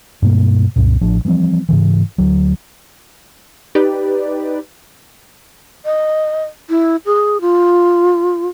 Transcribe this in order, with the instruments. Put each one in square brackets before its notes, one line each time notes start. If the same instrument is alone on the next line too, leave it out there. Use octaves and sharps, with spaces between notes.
[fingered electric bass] G2 B2 A#3
C2 F#2 A#2
A1 F3 D4
E3 F3 G3 C4
G#2 C#3 E3
D2 F#3
[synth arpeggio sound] D#4 G4 B4 D5
[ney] D#5
E4
G#4
F4